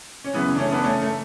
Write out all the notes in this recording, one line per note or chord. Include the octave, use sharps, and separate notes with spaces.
C#4
F#2 C#3 E3 B3
D4
A3 C#4
B3 D4
A3 C#4
A3